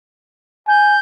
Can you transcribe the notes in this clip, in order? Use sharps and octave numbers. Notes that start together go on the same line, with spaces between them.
G#5 G6